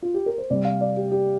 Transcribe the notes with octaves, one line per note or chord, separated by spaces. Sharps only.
F4
G4
A#4
C5
C3 G3 D5
F5
D5
G4
G4